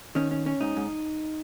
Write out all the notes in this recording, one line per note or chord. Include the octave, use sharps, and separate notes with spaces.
D#3 C#4
C#4
C#4
G#2 D#4
G#2